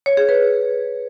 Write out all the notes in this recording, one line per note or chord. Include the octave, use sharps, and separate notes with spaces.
C#5
G#4
B4